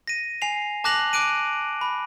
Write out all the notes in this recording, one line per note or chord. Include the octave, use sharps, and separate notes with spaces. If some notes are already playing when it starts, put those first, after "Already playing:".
A#6 D#7
G#5 C7 F7
A5 D6 F#6 A#6 F7 F#7
D6 F#6 D7 D#7
B5